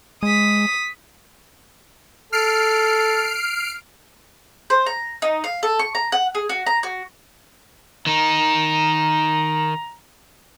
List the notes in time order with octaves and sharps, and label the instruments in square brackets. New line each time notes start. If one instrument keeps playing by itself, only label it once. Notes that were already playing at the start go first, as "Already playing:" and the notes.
[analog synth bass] G#3 [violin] D#6 B6
[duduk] A4 [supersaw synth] F6 C7 D7
[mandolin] C5
A#5
D#4
F5
A4
C#6
A#5
F#5
G#4
F#4
A#5
F#4
[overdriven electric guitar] D#3 D#4 [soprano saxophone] A#5